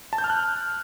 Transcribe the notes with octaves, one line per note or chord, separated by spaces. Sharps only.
A5
G6
F6
F#6